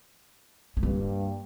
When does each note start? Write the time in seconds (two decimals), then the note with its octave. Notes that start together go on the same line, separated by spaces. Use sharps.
0.77 G#3
0.83 G2 A#3